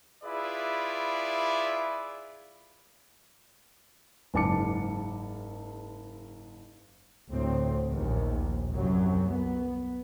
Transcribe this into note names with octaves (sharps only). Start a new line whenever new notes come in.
E4 F4 G#4 B4 D5 E5
F#1 G#2 A5 D6 C#7
D2 A2 C4
A#1 D#2
C2 F#2 F#3
B3